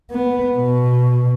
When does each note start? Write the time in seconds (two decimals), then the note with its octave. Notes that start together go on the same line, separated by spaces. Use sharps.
0.11 B3
0.57 B2